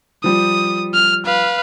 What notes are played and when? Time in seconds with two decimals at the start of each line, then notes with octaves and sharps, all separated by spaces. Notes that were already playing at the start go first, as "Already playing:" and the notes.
0.24 F3 G3 D#6
0.94 F6
1.26 B4 F5